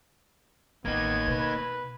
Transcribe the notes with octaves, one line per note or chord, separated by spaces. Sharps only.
A1 A#3 B3 D#4 G#6
B2 B4